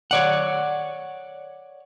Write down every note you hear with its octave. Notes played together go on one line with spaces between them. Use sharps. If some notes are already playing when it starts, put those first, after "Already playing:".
C#5 D5 F#5